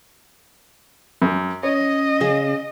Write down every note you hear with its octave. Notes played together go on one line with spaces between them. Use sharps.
F#2
C#4 C#5 D#5
C#3 G#4